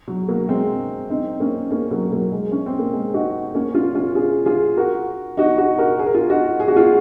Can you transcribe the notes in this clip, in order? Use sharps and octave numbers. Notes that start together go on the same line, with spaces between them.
F#3
F#3 A#3
G#3 C4
C4 D#4
A#3 C#4
A#3 C#4
F#3 A#3
F#3 A#3
G#3
C#4
C4
A#3
G#3
D#4 F#4
A#3 C#4
C#4 F4
C#4 F4
F4 G#4
F4 G#4
F#4 A#4
D#4 F#4
D#4 F#4
F#4 A#4
G#4
A#4
F4 G#4
D#4 F#4
G#4
F#4
F4 G#4